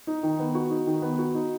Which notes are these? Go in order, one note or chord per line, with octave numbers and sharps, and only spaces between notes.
D#4
D#3
B3
F#4
D#4
D#3
B3
F#4
D#4